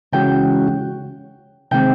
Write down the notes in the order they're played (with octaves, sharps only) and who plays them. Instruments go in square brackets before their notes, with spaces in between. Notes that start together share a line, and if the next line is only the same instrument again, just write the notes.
[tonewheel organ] C#3 E3 G#3 C#4 F#4 [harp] G5
[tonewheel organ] C3 D#3 G#3 C4 [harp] G5